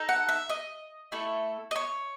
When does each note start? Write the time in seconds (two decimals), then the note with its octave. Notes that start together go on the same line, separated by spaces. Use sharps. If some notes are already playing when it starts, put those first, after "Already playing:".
Already playing: D#4 A4
0.09 F#5
0.29 E5
0.49 D#5
1.12 A3 E4 A4
1.71 D#5
1.76 C#5